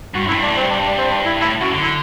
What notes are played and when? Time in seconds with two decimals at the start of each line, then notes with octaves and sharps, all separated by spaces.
0.14 G2 F#4
0.25 F#2
0.28 A2 E4
0.35 G2
0.43 D4
0.46 A2
0.56 G2 C4
0.70 D4
0.85 D4
0.98 C4
1.12 D4
1.26 E4
1.41 A2 E4
1.61 F#2 F#4
1.71 D3
1.82 E4